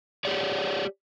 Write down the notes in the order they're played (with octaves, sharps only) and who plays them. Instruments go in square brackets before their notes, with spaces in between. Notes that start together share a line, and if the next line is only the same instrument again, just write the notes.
[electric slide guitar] G4 G#4 C#5 D5